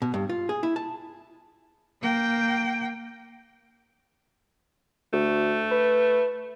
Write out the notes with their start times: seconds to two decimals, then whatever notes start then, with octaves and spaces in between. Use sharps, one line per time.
0.02 B2
0.14 G2
0.29 F4
0.49 G#4
0.63 E4
0.76 A5
2.02 A#3 G5
5.13 D2 A3
5.71 B4